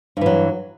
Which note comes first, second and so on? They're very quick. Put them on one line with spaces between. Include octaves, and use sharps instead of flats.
G2 E3 F#3